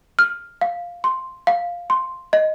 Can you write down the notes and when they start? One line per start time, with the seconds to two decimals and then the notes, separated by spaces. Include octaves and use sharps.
0.19 F6
0.61 F5
1.04 C6
1.47 F5
1.90 C6
2.33 D#5